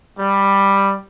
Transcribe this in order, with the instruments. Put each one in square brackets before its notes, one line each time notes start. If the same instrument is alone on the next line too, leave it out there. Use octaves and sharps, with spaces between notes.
[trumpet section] G3